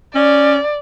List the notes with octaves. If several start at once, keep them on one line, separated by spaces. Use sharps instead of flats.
C#4 D5